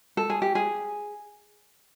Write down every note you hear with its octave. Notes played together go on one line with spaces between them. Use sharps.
A4
G#4
G4
G#4